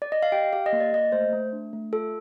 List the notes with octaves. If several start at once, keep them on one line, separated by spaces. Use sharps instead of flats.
D5
D#5
F5
G4 G5
G4 F5
D#5
A#3
D5
A#3 D#5
A3 C5
A3
D4
A3
F4 A4